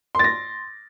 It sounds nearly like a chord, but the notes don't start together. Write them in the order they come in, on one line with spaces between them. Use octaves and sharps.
C6 A6 A#6